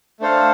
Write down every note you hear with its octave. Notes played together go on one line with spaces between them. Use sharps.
A3 D4 A4 C5 F5